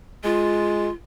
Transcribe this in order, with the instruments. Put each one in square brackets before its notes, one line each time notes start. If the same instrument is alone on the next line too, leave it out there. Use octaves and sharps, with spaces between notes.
[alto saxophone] G#3 [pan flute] F4